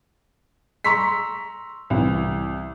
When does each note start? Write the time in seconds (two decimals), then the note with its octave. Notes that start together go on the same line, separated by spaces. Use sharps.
0.84 A#5 C6 C#6 E6 B6
1.90 C2 E3